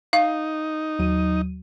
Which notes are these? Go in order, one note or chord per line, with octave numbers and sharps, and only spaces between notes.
D#4 F5
D#2 F#3 D#7